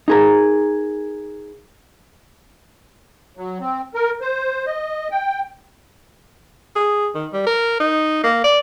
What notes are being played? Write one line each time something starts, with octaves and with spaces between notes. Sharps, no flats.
D#4 G#4 A#4
F#3
C4
A#4
C5
D#5
G5
G#4
D#3
G3
A#4
D#4
A#3
D5